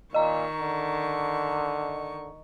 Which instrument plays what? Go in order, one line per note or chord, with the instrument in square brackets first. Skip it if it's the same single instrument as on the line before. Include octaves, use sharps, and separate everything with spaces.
[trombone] A#2 [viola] D#3 C#6 [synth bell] D#5 A#5
[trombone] D3